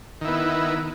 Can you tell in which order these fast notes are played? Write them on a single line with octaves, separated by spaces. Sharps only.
D#3 E4 B3